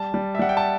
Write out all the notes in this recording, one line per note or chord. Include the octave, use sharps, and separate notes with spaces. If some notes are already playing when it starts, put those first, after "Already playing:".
Already playing: G3 A5
G3
E5
G3 F#5
G5
A5